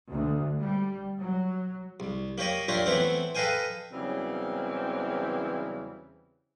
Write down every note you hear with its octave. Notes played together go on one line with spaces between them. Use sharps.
D2
G3
F#3
C2
A#3 G4 C#5 D#5
D4 E4 F4 G4 A#4 C#5
E3 A3 B3 C4 E4 C#5
A4 B4 D#5 F5 G5 G#5
E2 C#3 E3 F#3 G3 C4